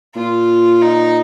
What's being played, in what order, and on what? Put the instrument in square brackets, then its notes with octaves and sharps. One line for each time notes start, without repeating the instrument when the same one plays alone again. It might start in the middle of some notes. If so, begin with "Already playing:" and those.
[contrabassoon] A#2 [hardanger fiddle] F4
[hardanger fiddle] D#4